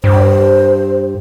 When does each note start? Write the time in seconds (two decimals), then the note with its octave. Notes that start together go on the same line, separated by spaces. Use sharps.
0.04 G2 C5